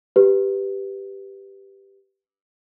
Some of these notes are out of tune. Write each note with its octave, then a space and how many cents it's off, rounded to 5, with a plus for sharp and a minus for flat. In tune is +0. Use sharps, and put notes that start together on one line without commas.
G4 +0 B4 +0